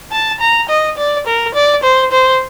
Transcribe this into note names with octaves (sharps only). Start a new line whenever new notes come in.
A5
A#5
D#5
D5
A#4
D5
C5
C5